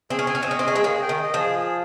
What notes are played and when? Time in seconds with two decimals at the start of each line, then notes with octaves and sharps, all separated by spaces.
0.10 C4 G#4
0.19 C#4
0.27 C4 G#5
0.35 C#4
0.43 C4
0.48 C#4 D#5
0.59 C4
0.65 C#4 G#4
0.75 G#3 C4
0.84 A#3 C#4 G#4
1.02 G5
1.09 D#3
1.22 D#5
1.34 F3
1.40 G#4
1.58 G#4